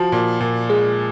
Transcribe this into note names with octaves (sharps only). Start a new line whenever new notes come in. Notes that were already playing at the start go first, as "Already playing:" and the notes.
Already playing: F3 F#4
A#2
A#2
G#3 G#4